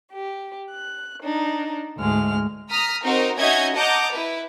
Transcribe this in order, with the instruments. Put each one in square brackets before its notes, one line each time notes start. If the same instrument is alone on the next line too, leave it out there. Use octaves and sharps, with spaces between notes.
[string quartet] G4
F#6
D4 D#4
D2 G#2 G#3 F6
[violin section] A#5 D#6 F6 B6
C4 D#4 F#4 A#4 C5
C#4 D#4 F#4 D#5 E5 G#6
D#5 F#5 A5 A#5 D6 G6
E4 B4